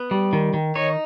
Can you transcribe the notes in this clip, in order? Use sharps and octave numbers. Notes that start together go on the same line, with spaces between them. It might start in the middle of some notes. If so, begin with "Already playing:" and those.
Already playing: B3
G3
D#3
D#3
D#4 C#5